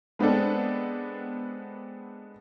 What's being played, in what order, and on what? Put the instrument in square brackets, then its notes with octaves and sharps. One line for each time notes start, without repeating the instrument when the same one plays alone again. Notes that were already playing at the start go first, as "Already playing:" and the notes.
[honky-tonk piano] G#3 B3 C4 D4 A4